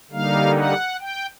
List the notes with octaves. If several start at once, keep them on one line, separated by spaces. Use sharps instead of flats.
D3 G3 A#3 D#4 F5
F#5
G5